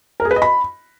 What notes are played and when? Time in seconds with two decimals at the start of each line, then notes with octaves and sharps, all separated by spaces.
0.20 A#4
0.25 G#4
0.31 B4
0.36 D#5
0.42 B5